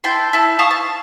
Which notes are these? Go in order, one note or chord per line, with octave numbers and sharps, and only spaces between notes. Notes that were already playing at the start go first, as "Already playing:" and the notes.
E4 G5 A5 C6
E4 A5
F5 A5 C#6 D#6
A5